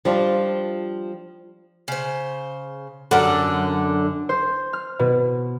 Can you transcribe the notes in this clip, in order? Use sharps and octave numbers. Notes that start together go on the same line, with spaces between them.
F3 G3 D4 F4
C#3 C5
F#2 D3 F#5
C5
F6
B2